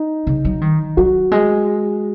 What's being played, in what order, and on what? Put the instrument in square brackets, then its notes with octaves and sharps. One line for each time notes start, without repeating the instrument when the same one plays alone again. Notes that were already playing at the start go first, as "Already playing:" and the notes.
Already playing: [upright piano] D#4
[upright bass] C#3
F#3
D#3
[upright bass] F#3 [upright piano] F#4
[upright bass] G#3